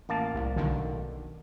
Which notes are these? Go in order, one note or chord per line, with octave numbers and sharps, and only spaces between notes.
A1 A#3 A5
C2
B1 D3 D#3